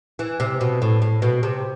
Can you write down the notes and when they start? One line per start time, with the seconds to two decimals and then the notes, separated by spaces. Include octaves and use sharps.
0.19 E3
0.40 C3
0.61 B2
0.82 A2
1.02 A2
1.22 B2
1.43 C3